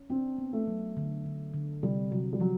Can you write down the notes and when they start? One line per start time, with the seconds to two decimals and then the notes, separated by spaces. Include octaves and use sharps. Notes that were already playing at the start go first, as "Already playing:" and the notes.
Already playing: C#4
0.10 C4 D4
0.38 B3
0.53 A3
0.67 F#3
0.97 D3
1.26 D3
1.54 D3
1.83 C3 G3
2.11 C3 F#3
2.33 G3
2.40 F3 F#3